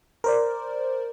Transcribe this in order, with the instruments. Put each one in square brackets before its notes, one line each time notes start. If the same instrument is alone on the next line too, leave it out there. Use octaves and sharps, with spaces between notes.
[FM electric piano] A#4 C5 D5